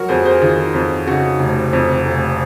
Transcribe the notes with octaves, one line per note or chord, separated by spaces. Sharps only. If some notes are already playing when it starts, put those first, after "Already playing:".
Already playing: F#3 F#4 A#4
F2 G#4 C5
G#4 C5
D#3 F4 G#4
F2
C#3 D#4 F#4
F1
F2
F1